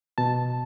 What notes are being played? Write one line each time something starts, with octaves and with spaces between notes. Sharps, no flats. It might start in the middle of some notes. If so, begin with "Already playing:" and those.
B2 A5